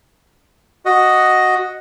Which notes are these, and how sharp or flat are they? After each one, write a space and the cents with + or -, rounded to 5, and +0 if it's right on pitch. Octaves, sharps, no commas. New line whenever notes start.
F#4 +0 D#5 +0